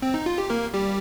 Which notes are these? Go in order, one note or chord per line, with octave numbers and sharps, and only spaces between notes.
C4
D#4
F4
G4
A#3 A#4
G3 G4